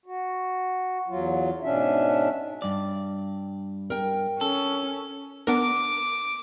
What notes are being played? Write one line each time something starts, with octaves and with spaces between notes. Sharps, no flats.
F#4
E2 F#3 F4
G#2 B2 C#4 D4 E5
G2 D5
A#4 G5
C#4 A4
B3 D4 A#4 D6